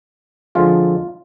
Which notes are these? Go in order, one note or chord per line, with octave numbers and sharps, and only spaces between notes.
F2 D3 F3 G#3 F4